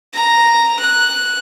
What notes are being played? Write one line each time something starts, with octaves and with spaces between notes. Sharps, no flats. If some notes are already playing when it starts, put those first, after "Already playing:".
A#5
F#6